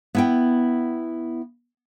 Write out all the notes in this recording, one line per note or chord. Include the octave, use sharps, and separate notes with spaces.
B3 E4 G5